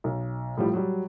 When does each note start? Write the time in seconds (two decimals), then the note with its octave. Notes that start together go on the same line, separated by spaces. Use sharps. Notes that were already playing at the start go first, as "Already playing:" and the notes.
0.04 B1
0.57 A2 F3 G3
0.73 F#3 G3